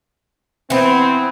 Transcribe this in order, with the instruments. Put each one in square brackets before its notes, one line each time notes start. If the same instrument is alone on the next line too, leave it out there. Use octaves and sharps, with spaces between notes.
[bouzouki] E3 B3 [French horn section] C4